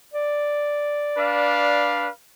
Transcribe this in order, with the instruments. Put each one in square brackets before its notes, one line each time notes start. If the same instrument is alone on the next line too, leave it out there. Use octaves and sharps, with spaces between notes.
[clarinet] D5
[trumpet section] D4 B4 F5